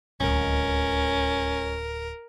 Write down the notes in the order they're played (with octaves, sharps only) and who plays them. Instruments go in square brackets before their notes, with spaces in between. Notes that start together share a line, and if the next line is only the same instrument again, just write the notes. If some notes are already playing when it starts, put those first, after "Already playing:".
[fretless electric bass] D1 [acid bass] C#2 [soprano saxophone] C#4 [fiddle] A#4